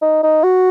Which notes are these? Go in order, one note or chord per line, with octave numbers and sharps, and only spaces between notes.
D#4
D#4
F#4